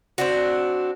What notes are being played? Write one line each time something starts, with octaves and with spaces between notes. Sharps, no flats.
C4 D4 F#4